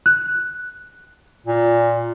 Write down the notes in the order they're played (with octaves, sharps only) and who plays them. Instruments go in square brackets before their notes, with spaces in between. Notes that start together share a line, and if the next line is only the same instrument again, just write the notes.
[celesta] F#6
[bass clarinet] A#2